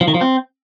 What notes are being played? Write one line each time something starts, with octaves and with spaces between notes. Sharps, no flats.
F3
D#3
F3
C4